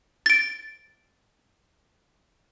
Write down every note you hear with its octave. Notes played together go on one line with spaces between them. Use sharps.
A6 D7